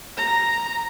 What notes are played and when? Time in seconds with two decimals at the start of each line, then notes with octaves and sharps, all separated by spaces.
0.17 A#5